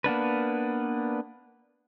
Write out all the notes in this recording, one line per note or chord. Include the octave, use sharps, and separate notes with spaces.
A#3 B3 D4 B4